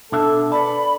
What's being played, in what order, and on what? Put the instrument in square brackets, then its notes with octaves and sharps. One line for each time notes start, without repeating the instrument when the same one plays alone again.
[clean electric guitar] B2 D4 E5 [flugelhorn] A4
[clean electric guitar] A4 B4 A5 [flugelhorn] D5 [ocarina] B5